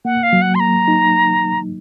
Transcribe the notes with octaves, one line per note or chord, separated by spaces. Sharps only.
A#3 F#5
F5
F#3
F#5
C6
A#3 A#5
D#4